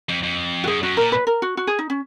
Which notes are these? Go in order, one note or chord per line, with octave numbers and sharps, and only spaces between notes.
F2
F2
F#4
F#2 G#4
F#2 F#4
A#2 A#4
B4
A#4
F#4
F#4
G#4
D#4
C#4